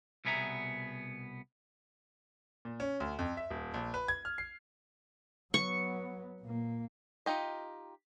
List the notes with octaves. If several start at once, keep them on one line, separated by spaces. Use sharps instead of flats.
C2 B2 B3 G#4 E5 A#5
A#2
C#4
D2
F2
E5
D#1
A#1
B4
G#6
F6
C7
F#3 B3 C#6
A#2 A#3
D#4 F4 G4 D#5